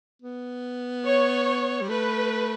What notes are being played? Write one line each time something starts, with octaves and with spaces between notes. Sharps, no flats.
B3
C#5
G3
A3 B4